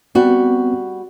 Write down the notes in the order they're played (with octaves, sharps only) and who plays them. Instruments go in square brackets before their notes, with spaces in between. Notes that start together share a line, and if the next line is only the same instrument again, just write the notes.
[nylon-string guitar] G3 F#4 [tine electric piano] B3 C4